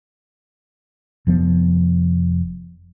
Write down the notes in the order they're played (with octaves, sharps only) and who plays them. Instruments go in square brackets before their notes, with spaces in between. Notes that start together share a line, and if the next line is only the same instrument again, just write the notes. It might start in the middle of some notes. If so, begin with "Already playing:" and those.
[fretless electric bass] F1 F3 B3